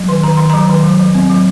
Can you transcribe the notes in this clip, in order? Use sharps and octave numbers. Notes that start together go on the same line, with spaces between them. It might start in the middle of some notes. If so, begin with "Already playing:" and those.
Already playing: F#3
D#3 C6
D#3 A#5
D#3 C6
F#3 A#5
D#3
F#3
F#3
C4
F#3